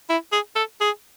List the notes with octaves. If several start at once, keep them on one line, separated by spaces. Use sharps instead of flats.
E4
G#4
A4
G#4